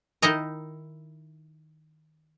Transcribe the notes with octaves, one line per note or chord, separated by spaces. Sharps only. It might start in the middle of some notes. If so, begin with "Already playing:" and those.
D#3 D#4 E4 D#5 A#5